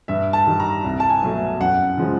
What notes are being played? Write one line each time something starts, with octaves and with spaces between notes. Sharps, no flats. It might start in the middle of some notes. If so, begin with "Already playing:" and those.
G2 E5
A5
D#3 G3
A#5
C2
A5
G#5
B2 F#3 A3
F#2 F#5
C#3 F3 G#3